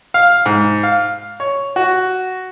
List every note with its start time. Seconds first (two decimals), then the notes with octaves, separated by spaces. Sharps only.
0.14 F5
0.46 G#2
0.83 F5
1.40 C#5
1.76 F#4